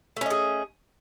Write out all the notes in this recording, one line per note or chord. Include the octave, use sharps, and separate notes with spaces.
A3 C#4 G#4 D#5